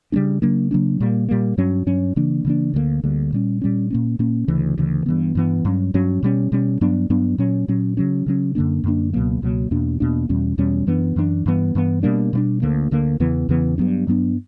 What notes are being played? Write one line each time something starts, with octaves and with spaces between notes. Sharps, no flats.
C#3 G3 A#3 D4
C#3 F#3 A#3 D4
C#3 F#3 A#3 D4
A#2 G3 A#3
A#2 G3 A#3
G2 F#3 C#4
G2 F#3 C#4
C#3 E3 A#3 D4
C#3 E3 A#3 D4
D2 D3 G3 A#3
D2 D3 G3 A#3
A#2 G3 C#4
A#2 G3 C#4
A#2 A#3 C#4
A#2 A#3 C#4
D2 C#3 E3
D2 C#3 E3
G2 E3 B3
G2 E3 B3
G2 F#3 C#4
G2 F#3 C#4
B2 G3 C#4
B2 G3 C#4
G2 F#3 B3 D4
G2 F#3 B3 D4
A#2 F#3 C#4
A#2 F#3 C#4
C#3 F#3 C#4
C#3 F#3 C#4
F#2 D3 A#3 D4
F#2 D3 A#3 D4
C#2 B2 F#3 A#3
C#2 B2 F#3 A#3
E2 B2 A#3 D4
E2 B2 A#3 D4
E2 B2 G3 C#4
E2 B2 G3 C#4
F#2 E3 B3 D4
F#2 E3 B3 D4
G2 E3 B3
G2 E3 B3
B2 G3 A#3 D4
B2 G3 A#3 D4
D2 D3 A#3
D2 D3 A#3
E2 C#3 E3 B3
E2 C#3 E3 B3
G2 F#3 B3 D4
G2 F#3 B3 D4